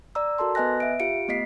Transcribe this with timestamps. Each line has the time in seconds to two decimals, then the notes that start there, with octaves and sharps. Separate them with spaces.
0.15 D5 A#5 E6
0.38 F#4 A4 A#4 A5 C6
0.55 B3 B4 D#5 G#5 F#6 A#6
0.80 E5 D7
1.00 F4 G4 F5 C#7 D7
1.28 A3 B3 D#5 B6 C7